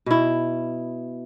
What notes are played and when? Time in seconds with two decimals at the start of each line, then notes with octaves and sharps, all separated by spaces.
0.06 B2 E4